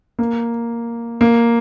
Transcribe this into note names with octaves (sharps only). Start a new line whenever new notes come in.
A#3
A#3